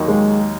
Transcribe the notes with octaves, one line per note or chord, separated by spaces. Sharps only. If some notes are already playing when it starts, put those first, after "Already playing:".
Already playing: D#2 D#3 F#3 A#3 D#4
G#3